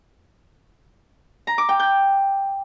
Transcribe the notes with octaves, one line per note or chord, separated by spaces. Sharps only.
A#5
D6
G5
G6